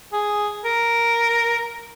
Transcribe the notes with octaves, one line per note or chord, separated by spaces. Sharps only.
G#4
A#4